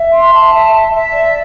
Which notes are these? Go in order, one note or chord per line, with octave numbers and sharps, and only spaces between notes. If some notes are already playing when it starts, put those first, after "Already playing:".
Already playing: E5
C6
A5
E5
E5
E5
D5